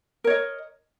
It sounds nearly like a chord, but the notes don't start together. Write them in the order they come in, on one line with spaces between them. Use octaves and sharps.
A#4 C#5 D#5